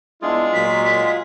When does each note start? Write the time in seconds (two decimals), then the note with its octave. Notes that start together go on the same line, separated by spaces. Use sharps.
0.22 G#3 B3 D4 E4 F4 G#4
0.54 A#2 F#3 B6